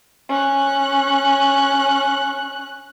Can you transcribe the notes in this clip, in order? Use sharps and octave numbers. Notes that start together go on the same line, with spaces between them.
C#4 F#6